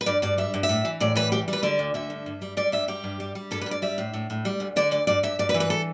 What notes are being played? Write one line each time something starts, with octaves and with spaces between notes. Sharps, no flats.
B4
G2 D5
G2 D5
G3 E5
G2
E5
A2
E3
A2 D5
E3 B4
G3 G4
G3
B4
D3 D5
D2
D3 E5
G2
G2
G3
G3 D5
G2 E5
G3 G4
G2
G3
G3
G2 A4
B4
G2
D5
G3 E5
A2
A2
A2
G3
D2
D3 D5
D2 D5
G2 D5
G2 E5
G2 D5
B4
E3
B4
A4